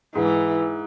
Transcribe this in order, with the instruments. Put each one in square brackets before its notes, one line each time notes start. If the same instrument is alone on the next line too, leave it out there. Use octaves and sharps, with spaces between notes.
[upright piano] G#2 [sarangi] E3